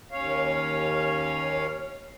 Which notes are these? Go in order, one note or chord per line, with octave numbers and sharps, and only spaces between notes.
D#2 C#4 C#5 F5